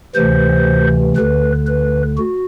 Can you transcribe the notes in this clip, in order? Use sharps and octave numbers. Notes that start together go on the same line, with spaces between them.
D2 C3 E3 C5
D2 D3 B4
B4
F#4